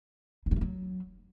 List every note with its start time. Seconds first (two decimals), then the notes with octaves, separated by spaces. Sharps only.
0.46 G#3
0.51 G3
0.56 A3
0.61 F#3